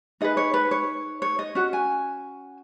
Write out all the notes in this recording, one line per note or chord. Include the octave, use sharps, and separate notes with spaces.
D#4 G#4 B4 D#5
C#5
B4
C#5
C#5
D#5
C#4 F#4
G#5